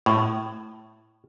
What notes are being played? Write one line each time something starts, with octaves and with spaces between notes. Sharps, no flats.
A2